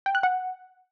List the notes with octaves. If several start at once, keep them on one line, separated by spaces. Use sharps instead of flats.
G5
F#6
F#5